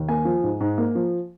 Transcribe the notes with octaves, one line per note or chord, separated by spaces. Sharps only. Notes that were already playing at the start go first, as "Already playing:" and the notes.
Already playing: D#2
A#3 G#5
F3
G#2
G#2
A#3
F3